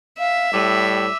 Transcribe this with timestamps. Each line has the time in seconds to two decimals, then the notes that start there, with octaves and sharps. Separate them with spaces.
0.19 E5 F5
0.53 A2 G3 D6 E6 D#7